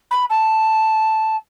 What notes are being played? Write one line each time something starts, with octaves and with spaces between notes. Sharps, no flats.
B5
A5